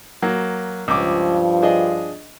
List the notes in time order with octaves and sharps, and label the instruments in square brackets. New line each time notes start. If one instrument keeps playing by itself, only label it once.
[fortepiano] F#3 A#3
[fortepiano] C#2 D6 [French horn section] G2 F3
[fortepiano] D4 G#4 D#5